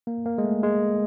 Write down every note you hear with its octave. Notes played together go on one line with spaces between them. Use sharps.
A#3
A#3
G#3
A3
G#3